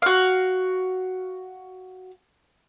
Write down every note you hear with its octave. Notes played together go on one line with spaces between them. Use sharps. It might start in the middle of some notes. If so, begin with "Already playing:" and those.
F#4 F5